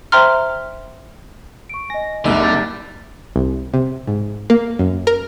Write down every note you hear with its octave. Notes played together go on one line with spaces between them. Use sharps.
C5 E5 G5 A#5 C6 F6
C#6 D7
D#5 G#5 A#6
F#1 C2 D3 D#4 E5
G6 A6
C2
C3
G#2
A#3
F#2
A#4